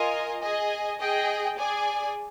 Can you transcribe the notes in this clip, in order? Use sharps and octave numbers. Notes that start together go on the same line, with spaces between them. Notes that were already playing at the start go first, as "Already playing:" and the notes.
Already playing: F4 A#4 D#5 G#5
G#4 D#5 G#5
G#4 D#5 G5
G#4 D5 G#5